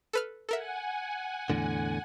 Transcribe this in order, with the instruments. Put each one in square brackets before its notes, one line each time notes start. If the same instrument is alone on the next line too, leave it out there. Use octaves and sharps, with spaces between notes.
[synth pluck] A4 B4 F6
[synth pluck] A4 A#4 E5 [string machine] F#5 G#5
[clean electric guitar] E2 A2 D3